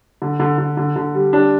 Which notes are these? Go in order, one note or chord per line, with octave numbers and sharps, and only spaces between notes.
D3
D3
D3
D3
D3
G3
G3 D4